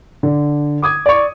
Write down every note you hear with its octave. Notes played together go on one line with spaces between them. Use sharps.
D3
D6 D#6 G#6
D5 C#6